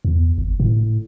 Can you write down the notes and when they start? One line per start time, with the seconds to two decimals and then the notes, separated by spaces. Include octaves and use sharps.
0.05 E2
0.38 G1
0.60 A2